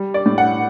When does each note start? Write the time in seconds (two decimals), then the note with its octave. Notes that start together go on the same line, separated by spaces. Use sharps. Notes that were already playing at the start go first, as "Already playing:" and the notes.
Already playing: G3
0.14 D5
0.26 A2
0.38 F#5